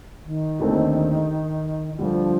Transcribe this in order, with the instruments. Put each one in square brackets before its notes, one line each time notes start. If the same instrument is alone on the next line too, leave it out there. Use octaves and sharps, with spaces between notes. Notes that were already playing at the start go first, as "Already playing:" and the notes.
[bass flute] D#3
[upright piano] D#2 D3 A3 C4
[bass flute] D#3
[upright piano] D2 D3 G3 [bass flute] F3